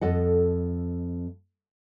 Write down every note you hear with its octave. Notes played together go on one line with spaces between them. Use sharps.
F2 A4 D#5 F#5